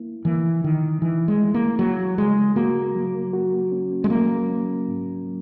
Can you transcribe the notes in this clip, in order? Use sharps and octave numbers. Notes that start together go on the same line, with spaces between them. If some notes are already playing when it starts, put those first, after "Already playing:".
Already playing: A#3 E4
E3 A#3
D#3 E4
E3 E4
G#3
E4
A#3
F#3 A#3
C#3 G#3
A#3 F#4
F#3
F#4
C#4
G#3
F#3 A#3
C#4
G#2
F#3